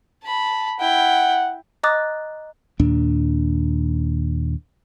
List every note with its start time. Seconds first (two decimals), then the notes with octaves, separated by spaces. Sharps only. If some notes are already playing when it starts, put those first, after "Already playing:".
0.24 A5 B5
0.80 E4 F#5 G5
1.83 D#5 A#5 D6 D#6 F#6 A6
2.79 D#2 A#2 D4